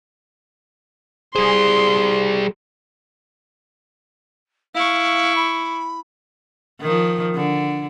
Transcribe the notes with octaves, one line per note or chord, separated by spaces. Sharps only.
G3 G#4 C5 C6
E4 F5 C#6
B5
D#3 F3
D3